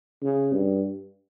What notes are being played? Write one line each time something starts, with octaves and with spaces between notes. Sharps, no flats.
C#3
G2